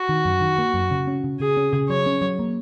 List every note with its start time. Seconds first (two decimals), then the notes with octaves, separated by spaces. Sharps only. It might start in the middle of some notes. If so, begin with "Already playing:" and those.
Already playing: F#4
0.09 D#3
0.25 F#2
0.41 D#3
0.58 A#3
0.74 F#2
0.91 C#3
1.07 C#4
1.24 C#3
1.40 C#3 G#4
1.57 C#4
1.73 C#3
1.89 F#3 C#5
2.06 C#4
2.22 F#3
2.39 A#3